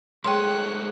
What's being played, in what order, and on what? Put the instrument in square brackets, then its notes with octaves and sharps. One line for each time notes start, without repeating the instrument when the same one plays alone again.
[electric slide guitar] G#2 G#3 A3 [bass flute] G#4 [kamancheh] C#5 F#6 [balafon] G5 C6